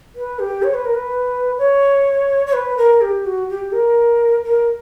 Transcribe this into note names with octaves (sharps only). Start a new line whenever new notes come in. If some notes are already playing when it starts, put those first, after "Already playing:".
B4
G4
C#5
B4
A#4
B4
C#5
C#5
B4
A#4
G4
F#4
G4
A#4
A#4